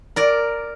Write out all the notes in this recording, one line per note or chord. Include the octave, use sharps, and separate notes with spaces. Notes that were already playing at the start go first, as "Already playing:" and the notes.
A#4 D5